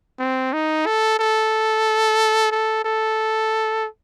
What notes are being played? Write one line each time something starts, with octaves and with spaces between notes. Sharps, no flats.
C4
D#4
A4
A4
A4
A4